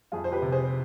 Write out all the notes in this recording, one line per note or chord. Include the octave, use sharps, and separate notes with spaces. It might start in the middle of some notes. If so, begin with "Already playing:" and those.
F2 F4 G#4
C5
G4 B4
C3
G#4 C5